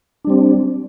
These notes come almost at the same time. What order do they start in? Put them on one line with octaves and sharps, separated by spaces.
D4 G3 C4